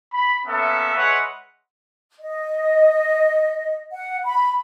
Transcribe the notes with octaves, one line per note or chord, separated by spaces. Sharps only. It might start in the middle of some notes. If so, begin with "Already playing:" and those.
B5
A#3 B3 C#4 A4 E5
G#3 B4 C#5 D#5 E5 F#5
D#5
F#5
B5